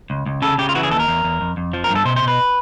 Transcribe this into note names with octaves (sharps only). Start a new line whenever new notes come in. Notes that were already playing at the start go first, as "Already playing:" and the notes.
C#2
C#2
C#3 A4
C#3 G4
F4
E3 F#4
G#4
D#2 A4
A#4
E2
E2
F2
F2
F3
A#4
G2
A4
B2 C5
C5
B2
B4